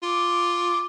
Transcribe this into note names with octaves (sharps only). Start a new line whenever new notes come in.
F4 D6